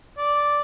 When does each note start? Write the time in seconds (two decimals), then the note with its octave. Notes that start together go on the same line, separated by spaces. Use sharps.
0.17 D5